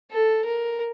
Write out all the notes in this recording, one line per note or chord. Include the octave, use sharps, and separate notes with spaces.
A4
A#4